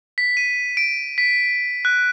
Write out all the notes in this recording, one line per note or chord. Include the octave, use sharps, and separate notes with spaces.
B6
D#7
D7
B6
F#6